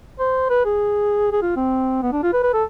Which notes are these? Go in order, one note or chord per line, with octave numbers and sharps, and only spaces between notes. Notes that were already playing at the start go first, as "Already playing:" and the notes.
C5
B4
G#4
G#4
F4
C4
B3
D4
F4
B4
B4
A4